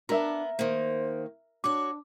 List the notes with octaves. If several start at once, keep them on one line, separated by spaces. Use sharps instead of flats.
B3 D4 A#4 E5
D#3 A#3 C5
D4 F#4 C#5 D6